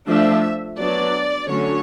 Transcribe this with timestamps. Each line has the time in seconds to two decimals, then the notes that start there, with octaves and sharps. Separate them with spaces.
0.08 F3 A3 D4 E5
0.79 F#3 B3 D4 D5
1.50 D3 F#3 A3 C#4 C#5